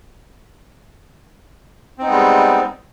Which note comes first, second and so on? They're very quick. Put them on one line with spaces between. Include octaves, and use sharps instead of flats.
C4 D#4 B3 G#3 G3